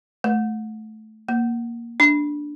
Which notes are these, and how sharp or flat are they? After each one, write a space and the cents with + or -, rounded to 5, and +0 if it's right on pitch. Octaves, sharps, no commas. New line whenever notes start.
A3 -15
A#3 +5
D4 +5